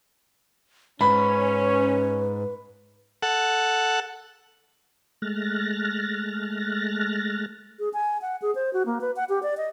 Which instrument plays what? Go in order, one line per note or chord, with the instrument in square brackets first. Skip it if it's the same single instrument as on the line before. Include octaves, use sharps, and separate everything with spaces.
[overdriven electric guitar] G#2 [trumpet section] C#4 [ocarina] B4 [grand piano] B5
[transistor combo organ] A4 F#5
[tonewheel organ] G#3 A3 F6 F#6 A6 A#6
[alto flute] G#4
G#5
F#5
G#4
C5
F#4
A#3
B4
F#5
G4
D5
D#5